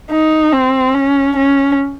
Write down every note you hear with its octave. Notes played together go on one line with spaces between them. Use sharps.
D#4
C4
C#4
C#4